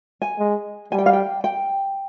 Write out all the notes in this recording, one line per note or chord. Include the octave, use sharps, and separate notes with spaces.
G#5
G#3
G3 G#5
G5
F5
G5
G5